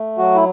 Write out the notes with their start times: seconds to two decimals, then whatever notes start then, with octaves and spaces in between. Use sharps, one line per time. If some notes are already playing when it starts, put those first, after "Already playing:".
Already playing: A3
0.18 F#3 F#4
0.35 E4